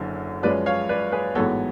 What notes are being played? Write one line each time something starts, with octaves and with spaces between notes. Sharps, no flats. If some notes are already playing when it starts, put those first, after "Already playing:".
Already playing: F#1 F#2 D3
F#2 F3 G#3 C#4 B4 D5
C#5 F5
B4 D5
G#4 B4
A1 G#2 F#3 B3 A4 C#5